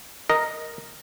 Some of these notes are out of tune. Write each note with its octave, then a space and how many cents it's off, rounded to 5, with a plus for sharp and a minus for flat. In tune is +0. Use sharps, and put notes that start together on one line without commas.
A#4 +0 D#5 +0